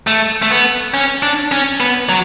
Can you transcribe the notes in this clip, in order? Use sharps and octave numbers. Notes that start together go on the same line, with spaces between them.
A3
A3
B3
C#4
D4
C#4
B3
F#3